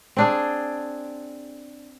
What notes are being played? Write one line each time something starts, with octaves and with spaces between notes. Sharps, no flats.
C4 D4 G#4